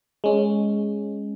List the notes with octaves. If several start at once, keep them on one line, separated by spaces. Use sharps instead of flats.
G#3 C#4